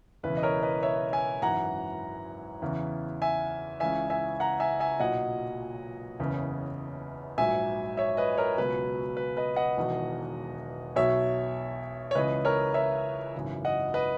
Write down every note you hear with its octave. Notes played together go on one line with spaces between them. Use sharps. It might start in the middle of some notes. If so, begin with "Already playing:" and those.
E1 E2 C#3 E3 B4
D#5
A#4 C#5
B4 D#5
C#5 E5
E5 G#5
G#1 F#2 E3 F#5 A#5
E2 C#3 E3
E5 G#5
C#2 C#3 E3 E5 G#5
E5 G#5
F#5 A#5
E5 G#5
E5 G#5
B1 A#2 F#3 D#5 F#5
F#1 E2 C#3
A#1 G#2 F#3 E5 G#5
C#5 E5
B4 D#5
A#4 C#5
C#2 B2 F#3 B4
B4
B4 D#5
D#5 F#5
E1 E2 D#3 F#3
B1 B2 F#3 C#5 E5
C#5
C#2 C#3 E3 B4 D#5
A#4 C#5
C#5 E5
G#1 F#2 C#3 E3
D#5 F#5
B4 D#5